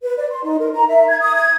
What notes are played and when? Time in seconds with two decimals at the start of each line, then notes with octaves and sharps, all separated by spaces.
0.03 B4
0.17 D5
0.31 C6
0.44 D#4
0.59 A#4
0.73 A#5
0.88 E5
1.08 G#6
1.21 D#6
1.36 G#6